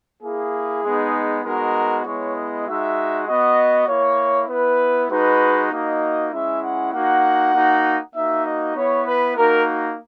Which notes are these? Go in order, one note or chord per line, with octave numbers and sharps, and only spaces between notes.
A#3 E4 G#4
G#3 B3 D#4
G#3 B3 D#4 F#4 A#4
G#3 B3 E4 C#5
D#5
G#3 D#4 F#4 E5
B3 F#4 D#5
A#3 E4 C#5
B3 E4 B4
G#3 D#4 F#4 B4
A#3 D#4 F#4 D#5
G#3 C#4 E4 E5
F#5
A#3 D#4 F#4 F#5
A#3 D#4 F#4
A#3 D#4 F#4 E5
D#5
B3 E4 C#5
B4
A#3 D#4 F#4 A#4